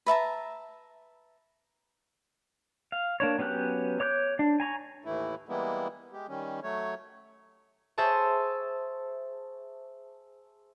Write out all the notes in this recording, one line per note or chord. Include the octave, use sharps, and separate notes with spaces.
B4 E5 A5 A#5
F5
A#3 D4 C#5
F#3 B3 C#4 G4 F#6
C#5 D6 F#6 G6
D4
G#5 A#5 C#6
D#2 A2 E3 A3 E4
E3 G3 G#3 A#3 B3 E4
G#3 G4
D#3 G3 C#4
F#3 A3 C#5
G#4 C5 E5 G#5 A5 C#6